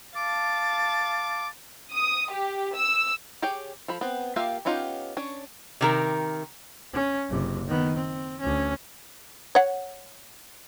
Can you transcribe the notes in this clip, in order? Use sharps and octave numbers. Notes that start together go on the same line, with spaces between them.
F5 A5 D6 A6
D#6
G4
E6
G4 G#4 C#5 G5
F3 A4 B5
B3 C4
A#3 F4 G4 E5 F5
B3 C#4 D#4 F4 G4
C#4 D4 C#5
C3 D#3 A#4
C#4
F#1 C3
D#3 B3
C4
D2 C#4
C#5 F#5